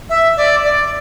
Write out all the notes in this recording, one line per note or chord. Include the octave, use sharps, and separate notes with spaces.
E5
D5
D5